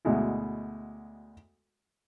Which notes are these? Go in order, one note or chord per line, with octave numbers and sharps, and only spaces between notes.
D2 B2 G#3 E4